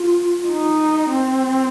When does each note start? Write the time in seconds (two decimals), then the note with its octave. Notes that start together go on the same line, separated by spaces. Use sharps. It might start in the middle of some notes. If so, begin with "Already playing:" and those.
Already playing: F4
0.47 D#4
1.12 C4